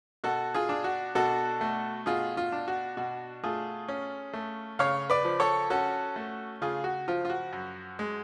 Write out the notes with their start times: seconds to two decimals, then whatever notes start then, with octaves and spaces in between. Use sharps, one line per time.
0.24 B2 F#4 A4
0.54 F4 G#4
0.69 D4
0.84 F#4
1.15 B2 F#4 A4
1.61 A3
2.06 B2 F4 G#4
2.37 F4
2.52 D4
2.68 F#4
2.97 B2 F#4
3.44 A3 F4 G#4
3.89 C#4
4.33 A3
4.79 C#3 C#5 F5
5.10 B4 D5
5.25 F3
5.40 A4 C#5
5.70 C#4 F#4 A4
6.16 A3
6.62 C#3 F4 G#4
6.84 F#4
7.08 F3 F4
7.25 F4
7.30 F#4
7.53 F#2
7.99 G#3